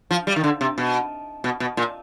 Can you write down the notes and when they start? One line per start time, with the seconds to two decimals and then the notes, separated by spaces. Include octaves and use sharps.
0.11 F3
0.27 G3
0.36 D#3
0.44 D3
0.61 C3
0.78 B2
1.44 B2
1.60 B2
1.77 A#2